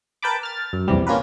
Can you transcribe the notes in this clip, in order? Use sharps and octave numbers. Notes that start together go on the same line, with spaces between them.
A#4 B4 G5 A5 B5 D6
F6 A6
F#2
A#1 E2 C3 G3
A#3 C#4 F4 G4 A#4 B4